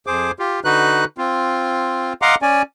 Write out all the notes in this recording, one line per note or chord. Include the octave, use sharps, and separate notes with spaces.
F2 G#4 C5 D6
F4 G4
D3 D#4 F#4 B4 F#6
C4 F4
D#5 F5 F#5 A#5 C6 D6
C#4 D5 G#5